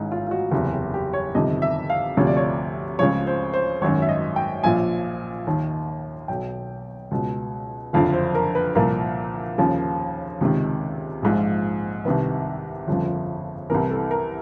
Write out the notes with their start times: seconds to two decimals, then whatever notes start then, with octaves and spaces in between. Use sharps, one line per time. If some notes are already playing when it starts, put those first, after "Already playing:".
Already playing: A1 G#2 D#3 D#4 E4
0.12 F4
0.27 F4
0.31 F#4
0.52 F#1 E2 C3 G4
0.73 G4
0.94 G4
1.13 C#5
1.35 G1 F2 C3 D#3 D#5
1.62 E5
1.90 F5
2.17 D2 C3 F3 C#5
2.27 D5
2.37 C#5
2.99 C#2 C#3 F3 C#5
3.27 C5
3.54 C5
3.82 G#1 F#2 D#3 C#5
4.02 E5
4.09 D#5
4.36 G5
4.64 A#1 A#2 F3 G#5
5.47 D#2 D#3
6.28 B1 B2 G5
7.11 C#2 B2
7.93 F#1 F2 D3 F3 F5
8.14 C5
8.35 A#4
8.55 B4
8.75 C2 A#2 F3 A#4
9.58 D#2 C#3 F3
10.41 C#2 C3 D#3
11.23 A#1 G#2 F3
12.05 C2 C3 D#3 B4
12.87 G1 F2 C#3 F3
13.70 C2 C3 E3 A#4
13.90 A4
14.11 A#4